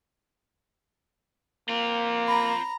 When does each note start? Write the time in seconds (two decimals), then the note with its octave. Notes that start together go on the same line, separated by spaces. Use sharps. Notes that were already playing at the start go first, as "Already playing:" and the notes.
1.69 A#3 C4 F4
2.28 A#5 B5